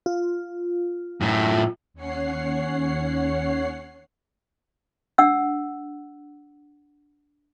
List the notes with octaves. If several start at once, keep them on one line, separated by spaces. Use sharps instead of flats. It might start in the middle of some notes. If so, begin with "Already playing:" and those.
F4
F#2 A2
D#2 C#4 C#5 F#5 C7
D4 F#5 E6